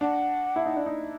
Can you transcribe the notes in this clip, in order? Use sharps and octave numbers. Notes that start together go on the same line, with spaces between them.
D4 F#5
E4
D#4
D4
D#4